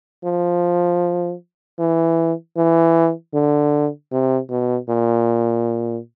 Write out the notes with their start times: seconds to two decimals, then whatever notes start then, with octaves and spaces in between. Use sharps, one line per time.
0.24 F3
1.79 E3
2.57 E3
3.34 D3
4.12 C3
4.50 B2
4.89 A#2